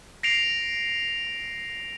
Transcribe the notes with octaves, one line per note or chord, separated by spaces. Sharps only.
A#6 C7 D7 F7